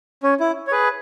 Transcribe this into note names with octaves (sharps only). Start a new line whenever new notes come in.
C#4
E4
C#5
G#4 B4